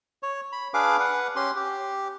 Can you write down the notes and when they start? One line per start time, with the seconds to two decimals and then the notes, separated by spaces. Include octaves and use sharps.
0.23 C#5
0.52 B5
0.74 D4 G#4 B4 F5 D6
1.00 B4 F#5
1.36 C#4 G4 C6
1.56 G4